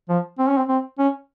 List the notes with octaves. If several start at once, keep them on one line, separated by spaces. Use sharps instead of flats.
F3
C4
C#4
C4
C4
C#4